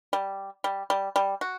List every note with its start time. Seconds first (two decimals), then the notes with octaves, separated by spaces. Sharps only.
0.13 G3
0.64 G3
0.90 G3
1.16 G3
1.41 F#4